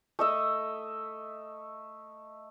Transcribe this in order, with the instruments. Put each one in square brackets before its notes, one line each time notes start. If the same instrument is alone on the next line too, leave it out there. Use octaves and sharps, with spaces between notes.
[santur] A3 D#5 E5